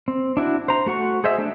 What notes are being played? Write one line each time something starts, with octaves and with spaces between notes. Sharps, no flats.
C4
D4 E4 F#4
C5 A#5
A3 F#4 F#5 C#6
G#4 C5 D#5 E5
A3 D4 A5